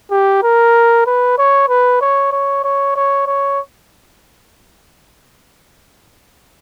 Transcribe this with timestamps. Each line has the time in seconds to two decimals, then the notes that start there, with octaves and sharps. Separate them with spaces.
0.11 G4
0.43 A#4
1.07 B4
1.38 C#5
1.69 B4
2.01 C#5
2.32 C#5
2.64 C#5
2.96 C#5
3.27 C#5